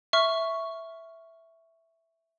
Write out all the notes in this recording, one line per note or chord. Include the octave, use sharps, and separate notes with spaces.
E5 C#6 F6